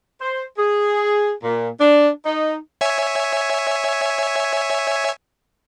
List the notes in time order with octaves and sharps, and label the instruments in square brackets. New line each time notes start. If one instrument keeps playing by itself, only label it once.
[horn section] C5
G#4
A#2
D4
D#4
[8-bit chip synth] C#5 E5 G#5